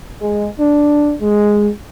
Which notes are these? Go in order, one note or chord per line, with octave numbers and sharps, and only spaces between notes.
G#3
D4
G#3